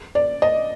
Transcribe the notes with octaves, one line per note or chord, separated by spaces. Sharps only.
D5
D#5